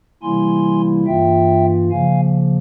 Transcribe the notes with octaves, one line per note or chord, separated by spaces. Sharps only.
C3 E3 G3 A#3 E4 G#5 C6
G2 E3 A#3 F4 E5 G5
C#3 F3 A#3 F5 G#5